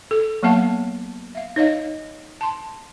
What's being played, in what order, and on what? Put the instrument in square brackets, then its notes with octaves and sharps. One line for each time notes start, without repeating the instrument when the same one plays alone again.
[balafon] A4
F#3 A#3 B3 F#5 A5
E5 F5
D#4 C#5 D#5 F5
A5 C6